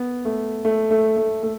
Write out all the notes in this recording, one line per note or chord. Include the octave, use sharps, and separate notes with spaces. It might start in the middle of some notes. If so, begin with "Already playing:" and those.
Already playing: B3
A3
A3
A3
A3
A3